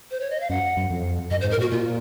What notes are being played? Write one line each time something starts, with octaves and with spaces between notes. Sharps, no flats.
C5
C#5
D#5
F5
F#2 F#5
F#2
F2
F#2 D#5
C5
G#2
A#4
A#2 F#4
A#2 F4